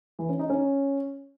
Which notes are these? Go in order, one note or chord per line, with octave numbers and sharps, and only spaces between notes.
E3
C#4
D#4
C#4